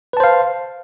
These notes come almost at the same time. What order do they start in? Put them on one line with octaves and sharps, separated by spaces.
B4 A5 C5 F5